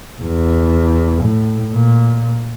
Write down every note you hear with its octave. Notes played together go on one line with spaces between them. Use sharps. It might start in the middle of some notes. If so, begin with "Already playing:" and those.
E2
A2
A#2